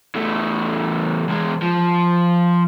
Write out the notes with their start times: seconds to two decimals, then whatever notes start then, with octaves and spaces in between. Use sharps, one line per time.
0.15 E2 A3
1.29 E2 G#3
1.62 F3